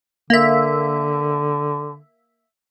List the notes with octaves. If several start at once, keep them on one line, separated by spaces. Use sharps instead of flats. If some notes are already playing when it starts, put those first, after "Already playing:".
D3 A#3 E5